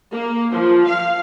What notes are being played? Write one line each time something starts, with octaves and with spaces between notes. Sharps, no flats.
A#3
F3
F5